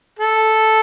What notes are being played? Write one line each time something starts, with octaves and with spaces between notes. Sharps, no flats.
A4